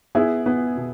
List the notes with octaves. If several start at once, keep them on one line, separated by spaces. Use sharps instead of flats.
B3 E4 G#4
B3
B2